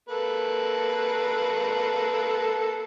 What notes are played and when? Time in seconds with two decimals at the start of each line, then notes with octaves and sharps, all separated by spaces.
0.09 A#3 A4 B4